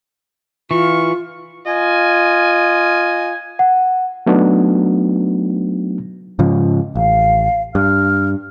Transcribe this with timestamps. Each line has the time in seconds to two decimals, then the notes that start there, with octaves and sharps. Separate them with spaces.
0.71 E3 F4 C#6
1.66 F4 D#5 G#5
3.59 F#5
4.26 F#3 A3 B3 D4 D#4 F#4
6.39 G#2 C#3 F3
6.95 A1 F5
7.75 G2 F6